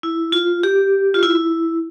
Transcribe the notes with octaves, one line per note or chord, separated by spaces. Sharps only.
E4
F4
G4
F4
E4